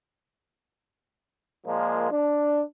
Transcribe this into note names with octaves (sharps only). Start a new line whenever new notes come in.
A#2 F3 G#3 A#3
D4